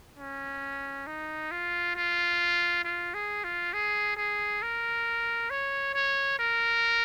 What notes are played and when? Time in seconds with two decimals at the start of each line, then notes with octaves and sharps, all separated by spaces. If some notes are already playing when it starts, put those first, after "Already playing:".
0.19 C#4
1.07 D#4
1.51 F4
1.96 F4
2.84 F4
3.14 G#4
3.44 F4
3.73 G#4
4.17 G#4
4.62 A#4
5.50 C#5
5.94 C#5
6.39 A#4